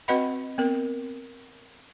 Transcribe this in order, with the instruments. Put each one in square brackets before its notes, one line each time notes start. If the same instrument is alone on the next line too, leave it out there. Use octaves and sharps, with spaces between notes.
[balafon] C4 F#4 B4 D#5 F#5 B5
B3 C4 A#4